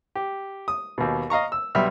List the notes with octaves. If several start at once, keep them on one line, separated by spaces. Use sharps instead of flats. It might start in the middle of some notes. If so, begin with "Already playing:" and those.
G4
D#6
D#2 B2
D#5 F5 A#5 C#6
E6
B1 G3 E5 F6